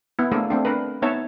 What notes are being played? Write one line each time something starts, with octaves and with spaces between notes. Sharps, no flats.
B3 E4
A3 A#3 D4 G#4 A4
A3 C4 D4
D4 A#4 B4
B3 D#4 C#5 E5 A5